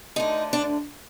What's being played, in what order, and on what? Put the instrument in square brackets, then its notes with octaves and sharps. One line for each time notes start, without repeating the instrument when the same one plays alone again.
[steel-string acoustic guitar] D2 D3 D#4
D4